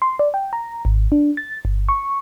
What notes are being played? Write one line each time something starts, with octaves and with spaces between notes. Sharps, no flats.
C6
D5
G5
A#5
G#1
D4
A6
G1
C#6